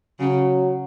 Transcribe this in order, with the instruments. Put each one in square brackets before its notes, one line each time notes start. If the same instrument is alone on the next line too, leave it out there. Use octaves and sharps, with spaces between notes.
[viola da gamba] C#3 [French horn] F#3